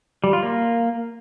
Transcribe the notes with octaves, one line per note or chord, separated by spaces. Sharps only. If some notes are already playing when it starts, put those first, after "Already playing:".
G3
F4
A#3